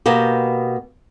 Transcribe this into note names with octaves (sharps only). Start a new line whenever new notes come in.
B2 A#3 B3 G4